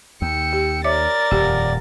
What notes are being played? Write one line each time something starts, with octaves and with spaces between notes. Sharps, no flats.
D#2 G5 E6 C#7
G4
A#4 C#5 D5 E5 D6 A6
D#1 F2 G4